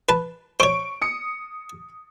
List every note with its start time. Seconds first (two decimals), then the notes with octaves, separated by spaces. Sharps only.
0.09 B4 A5
0.60 C5 C#5 C#6 D7
1.02 D#6 C#7